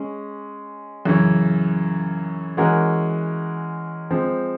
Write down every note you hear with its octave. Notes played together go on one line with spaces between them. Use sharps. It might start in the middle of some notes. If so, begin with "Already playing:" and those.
Already playing: G#3 C#4
F#2 C#3 E3
E3 G#3 C#4 F#4 A#4
F3 G#3 C4